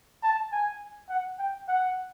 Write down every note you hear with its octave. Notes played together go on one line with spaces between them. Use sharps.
A5
G#5
F#5
G5
F#5